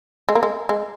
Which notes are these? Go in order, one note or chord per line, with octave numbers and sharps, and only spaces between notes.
G#3
A#3
G#3
G#3